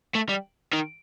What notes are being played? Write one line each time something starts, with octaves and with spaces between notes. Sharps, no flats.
A3
G3
D#3